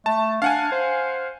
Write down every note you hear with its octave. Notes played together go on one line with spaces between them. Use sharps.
A3 A5
D4 F5 F#5 G#5
C5